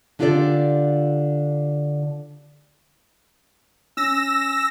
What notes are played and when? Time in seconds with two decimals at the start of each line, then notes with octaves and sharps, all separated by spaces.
0.19 D3 D4 F4 G4 A4 D5
3.97 C#4 E6 A#6